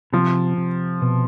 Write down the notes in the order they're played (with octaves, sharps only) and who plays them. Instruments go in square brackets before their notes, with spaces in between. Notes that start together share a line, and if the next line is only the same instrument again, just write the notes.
[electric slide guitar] C3 [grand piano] F3
[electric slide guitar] C3
B2